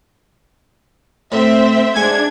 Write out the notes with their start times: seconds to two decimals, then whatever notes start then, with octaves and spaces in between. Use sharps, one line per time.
1.32 A2 C4 C5 E5
1.96 G#2 D4 G#5 C#6 G#6